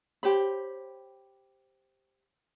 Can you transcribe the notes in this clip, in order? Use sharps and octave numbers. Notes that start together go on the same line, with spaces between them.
G4 C5 C#5 B5